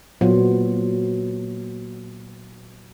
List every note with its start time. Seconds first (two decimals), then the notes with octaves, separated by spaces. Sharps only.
0.21 A#2 F#3 B3 F#4 C5